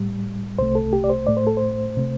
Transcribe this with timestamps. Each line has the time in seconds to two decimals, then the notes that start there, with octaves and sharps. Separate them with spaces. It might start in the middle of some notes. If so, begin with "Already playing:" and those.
Already playing: A2 G3
0.59 C2 C3 A3 C5
0.75 A4
0.93 G4
1.04 D5
1.10 C5
1.27 A2 A3 D5
1.37 C5
1.47 A4
1.57 C5
1.97 C3 A3